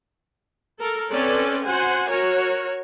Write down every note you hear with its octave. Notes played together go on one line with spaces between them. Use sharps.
A4 A#4
C4 C#4 A4 B4 C#5 D5
F#4 C5 F#5 G#5
F#4 A#4 C#5